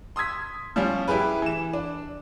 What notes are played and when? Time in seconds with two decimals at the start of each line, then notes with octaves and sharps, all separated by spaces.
0.16 C6 D#6 E6 G#6 B6
0.76 F3 G3 C#4
1.08 E4 G4 G#4 B4
1.42 E3 E7
1.73 D4